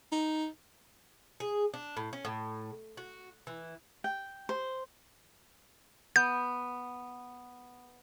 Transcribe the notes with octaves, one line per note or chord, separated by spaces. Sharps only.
D#4
G#4
D4
A2
C#4
A2
F#4
E3
G5
C5
B3 G6